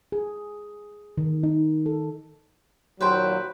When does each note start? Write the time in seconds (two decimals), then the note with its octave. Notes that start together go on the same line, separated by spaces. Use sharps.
0.12 G#4
1.17 D#3
1.43 D#4
1.86 A4
3.01 D#2 A#2 F#3 B4 C5 G5